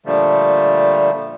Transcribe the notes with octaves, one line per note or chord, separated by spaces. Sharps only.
A#2 D3 F3 G3 A3